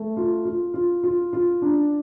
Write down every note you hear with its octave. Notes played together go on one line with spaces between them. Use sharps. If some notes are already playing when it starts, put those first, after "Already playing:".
Already playing: A3
F4
F4
F4
F4
F4
D4